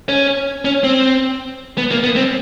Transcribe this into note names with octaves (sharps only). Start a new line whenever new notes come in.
C#4
C#4
C4
B3
A#3
B3
C4